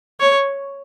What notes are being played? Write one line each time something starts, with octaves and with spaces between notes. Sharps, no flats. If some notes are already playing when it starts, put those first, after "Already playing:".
C#5